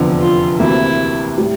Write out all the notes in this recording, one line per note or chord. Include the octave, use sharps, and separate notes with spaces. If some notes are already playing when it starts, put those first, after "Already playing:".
Already playing: F1 E2 D3 F3
F4
D2 C3 E3 A#3 E4
A2 G3